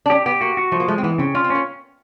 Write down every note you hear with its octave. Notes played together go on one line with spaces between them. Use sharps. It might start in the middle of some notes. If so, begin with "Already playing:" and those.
D4
C#4 G4
B3 G4
A#3 F#4
F#4
F3 A3
A#3
G#3 A3
C4
E3 B3
C#3 C4
C#4 F4
C4
A#3 C#4